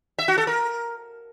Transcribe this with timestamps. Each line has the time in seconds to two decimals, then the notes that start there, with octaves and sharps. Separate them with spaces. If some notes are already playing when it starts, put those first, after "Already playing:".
0.18 E5
0.28 F#4
0.38 A4
0.47 A#4